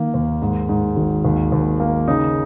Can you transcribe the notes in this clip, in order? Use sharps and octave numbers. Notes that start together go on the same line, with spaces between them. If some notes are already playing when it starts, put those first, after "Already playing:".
Already playing: D#3 A#3
D#2
G#2
G#2
G#1
D#2
D#2
A#3
C#3 D#4